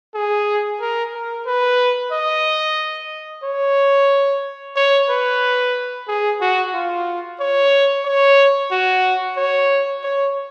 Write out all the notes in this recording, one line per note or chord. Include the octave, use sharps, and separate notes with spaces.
G#4
A#4
A#4
B4
D#5
C#5
C#5
B4
G#4
F#4
F4
C#5
C#5
F#4
C#5
C#5